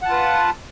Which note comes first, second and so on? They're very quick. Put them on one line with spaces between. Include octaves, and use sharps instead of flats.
F#5 A5 F4 B4